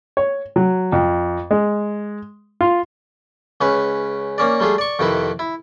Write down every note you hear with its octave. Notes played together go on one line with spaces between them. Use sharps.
C#5
F#3
F2
G#3
F4
C#2 C#4 B4
A#3 C#4 D5
G3 A3 F4 G#4
D5 C#6
F2 C3 D#3 E4 B4
E4